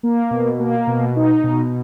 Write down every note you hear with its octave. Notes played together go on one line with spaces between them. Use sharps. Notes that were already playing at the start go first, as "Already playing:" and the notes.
A#3
B2
A#3
B2
D#4
B2